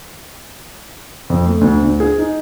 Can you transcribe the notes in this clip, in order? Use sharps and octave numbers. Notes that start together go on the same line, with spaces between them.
F2
A3
D2
D2
G#4
D#4